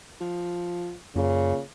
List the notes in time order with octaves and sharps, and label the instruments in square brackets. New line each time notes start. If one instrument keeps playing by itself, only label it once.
[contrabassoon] F3
[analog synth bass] F#2 [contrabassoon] A#2 [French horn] C#3